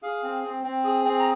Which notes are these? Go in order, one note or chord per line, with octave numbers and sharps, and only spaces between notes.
G#4 F5
C4
C4
C4
G#4
C4
A#5